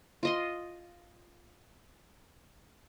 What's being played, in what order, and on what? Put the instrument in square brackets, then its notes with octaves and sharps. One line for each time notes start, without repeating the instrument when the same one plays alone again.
[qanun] F4 D#5 C6